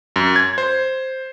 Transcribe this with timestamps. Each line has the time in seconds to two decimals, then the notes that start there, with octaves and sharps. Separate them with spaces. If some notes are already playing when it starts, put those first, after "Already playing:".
0.16 F#2
0.36 G#6
0.58 C5